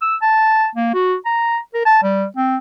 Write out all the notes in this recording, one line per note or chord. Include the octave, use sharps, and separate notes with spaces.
E6
A5
A#3
F#4
A#5
A#4
A5
G3
C4